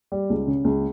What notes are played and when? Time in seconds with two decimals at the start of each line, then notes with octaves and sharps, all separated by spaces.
0.12 G3
0.30 C#2
0.48 C#3
0.64 C#2